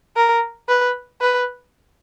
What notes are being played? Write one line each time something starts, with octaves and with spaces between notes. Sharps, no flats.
A#4
B4
B4